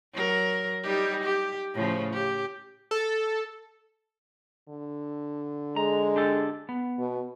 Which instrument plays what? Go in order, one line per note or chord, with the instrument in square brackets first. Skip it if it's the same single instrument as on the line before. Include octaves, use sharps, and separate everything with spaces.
[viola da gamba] F#3 A#4
G3 D#4 G4
G4
A2 C#3 F3
G4
[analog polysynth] A4
[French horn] D3
[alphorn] G#3 [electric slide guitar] A#5
[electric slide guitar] D4 G4 A4
B3
[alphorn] B2